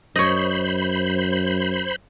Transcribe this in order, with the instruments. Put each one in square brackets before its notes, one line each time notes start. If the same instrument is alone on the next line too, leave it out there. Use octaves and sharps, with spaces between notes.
[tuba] F#2 [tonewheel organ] C5 B5 [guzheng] C#5 D#5